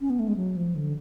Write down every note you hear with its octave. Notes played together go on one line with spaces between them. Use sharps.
C#4
B3
A3
G#3
F#3
F3
D3